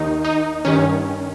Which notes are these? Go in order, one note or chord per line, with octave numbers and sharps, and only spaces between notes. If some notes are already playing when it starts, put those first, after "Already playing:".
Already playing: D#2 D#3 D#4
D#4
G2 D#3 C#4